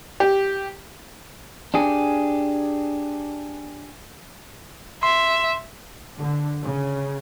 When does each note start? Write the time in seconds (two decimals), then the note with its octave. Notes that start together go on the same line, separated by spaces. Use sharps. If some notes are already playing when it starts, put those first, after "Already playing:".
0.20 G4
1.74 D4 G4 G#4
5.03 E5 C6
6.19 D3
6.64 C#3